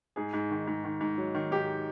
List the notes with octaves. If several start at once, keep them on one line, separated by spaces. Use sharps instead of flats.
G#2 G#4
G#2
D#3
G#2
D#3
G#2
F#3
D#3
G#2 G4